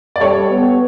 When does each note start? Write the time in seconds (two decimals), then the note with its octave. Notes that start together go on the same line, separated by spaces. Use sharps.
0.16 D5
0.20 G3 A4 C#5
0.50 B3